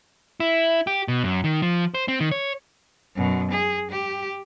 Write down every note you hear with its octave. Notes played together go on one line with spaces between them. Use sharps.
E4
G4
B2
F#2
D#3
F3
C5
C4
D#3
C#5
F#2 B2
G#4
G4